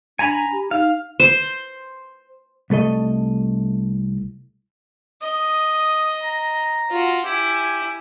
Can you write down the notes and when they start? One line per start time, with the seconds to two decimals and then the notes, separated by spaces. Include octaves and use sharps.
0.19 D4 G#5 A#5 B5
0.52 G4
0.71 D#4 F5
1.20 C5
2.70 C2 A3 A4 D#5
5.22 D#5 D#6
6.23 A#5
6.90 F4 F#4
7.25 E4 G4 G#5